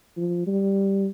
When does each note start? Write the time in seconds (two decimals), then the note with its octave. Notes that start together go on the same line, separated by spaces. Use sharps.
0.17 F3
0.47 G3